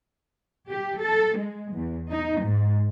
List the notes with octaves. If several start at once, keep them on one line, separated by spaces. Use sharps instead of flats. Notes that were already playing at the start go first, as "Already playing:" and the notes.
G4
A4
G#3
E2
D#4
G#2